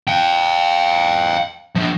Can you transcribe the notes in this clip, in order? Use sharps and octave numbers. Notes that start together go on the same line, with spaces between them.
F5 G5
F3 D4